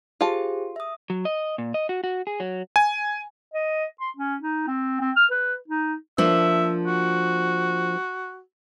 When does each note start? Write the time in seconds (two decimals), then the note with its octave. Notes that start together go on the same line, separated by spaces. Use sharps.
0.21 F4 G4 G#4 C5 A5
0.76 E5 D#6
1.10 F#3
1.25 D#5
1.58 A#2
1.74 D#5
1.89 F#4
2.04 F#4
2.27 G#4
2.40 F#3
2.76 G#5
3.54 D#5
4.00 C6
4.17 C#4
4.42 D#4
4.67 C4
5.01 C4
5.16 F6
5.31 B4
5.68 D#4
6.18 F3 A#3 D4 E5
6.87 F#4